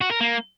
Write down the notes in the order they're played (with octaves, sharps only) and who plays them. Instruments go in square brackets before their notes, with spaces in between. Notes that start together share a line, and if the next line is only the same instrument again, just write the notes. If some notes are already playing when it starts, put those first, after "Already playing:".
[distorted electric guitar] F#4
A#4
A#3